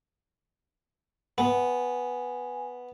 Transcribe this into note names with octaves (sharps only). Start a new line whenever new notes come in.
B3 G#5